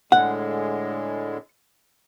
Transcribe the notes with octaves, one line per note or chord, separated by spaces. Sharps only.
A2 D3 G#3 F#5